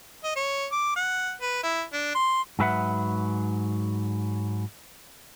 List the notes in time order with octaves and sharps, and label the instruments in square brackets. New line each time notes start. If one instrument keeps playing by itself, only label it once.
[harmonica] D#5
C#5
D6
F#5
B4
E4
D4
C6
[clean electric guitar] G#2 F#3 G4 B4 E5 F#5